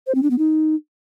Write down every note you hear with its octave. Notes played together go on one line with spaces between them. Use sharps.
C5
C4
D4
B3
D#4